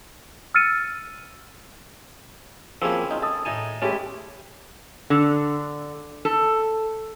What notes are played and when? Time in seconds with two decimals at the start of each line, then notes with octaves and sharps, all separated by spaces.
0.54 E6 F6 A6 C#7 D#7
2.82 F3 A#3 C4 C#4 E4 F#4 G#4 A#4
3.11 D#4 F4
3.22 A4 D#5 D#6
3.45 A2 D#4 G#5
3.82 G#3 A3 C#4 E4 G4 D#5
5.10 D3
6.25 A4